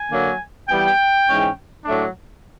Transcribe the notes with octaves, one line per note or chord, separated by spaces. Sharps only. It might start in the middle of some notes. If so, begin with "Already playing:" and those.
Already playing: G#5
D3 F#3 A#3
E3 G3 B3 G5
G#2 E3 G#3 C#4
A2 F#3 A3 D4